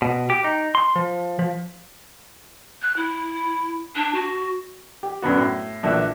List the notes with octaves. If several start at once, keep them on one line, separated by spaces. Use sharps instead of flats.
B2
G4
D#4
C6
F3
F3
F#6
E4
D4
F#4
G4
F#2 D3 B3 F#4
A2
A#1 D3 E3 E5 F#6